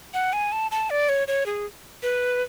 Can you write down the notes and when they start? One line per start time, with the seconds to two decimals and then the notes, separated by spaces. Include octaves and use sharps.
0.14 F#5
0.33 G#5
0.52 A5
0.71 A5
0.90 D5
1.09 C#5
1.28 C#5
1.46 G#4
2.03 B4